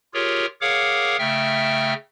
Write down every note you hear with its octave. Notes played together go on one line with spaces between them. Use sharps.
F4 G4 G#4 A#4 C#5
G#4 A#4 C#5 F5 F#5 D6
C#3 A3 E5 G5 F6